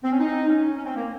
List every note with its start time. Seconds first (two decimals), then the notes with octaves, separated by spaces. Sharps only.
0.04 C4
0.12 C#4
0.20 D#4
0.49 C#4
0.77 C#4
0.86 C4
0.96 A#3